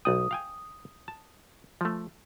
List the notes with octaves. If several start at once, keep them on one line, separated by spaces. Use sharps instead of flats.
B1 D5 G5 D#6
F5 G5 G#5
A5
F3 A3